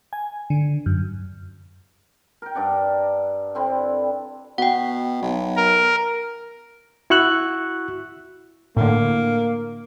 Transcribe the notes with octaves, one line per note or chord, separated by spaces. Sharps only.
G#5
D3
F#2
A#4 G5
G2 D4 D5 F#5
D3 C4 E4
B2 F#5 G5
B1
A#4
E4 F#4 C#6 E6 F#6
A2 D3 A#3